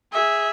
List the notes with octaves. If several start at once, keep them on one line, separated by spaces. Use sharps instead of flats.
G#4 E5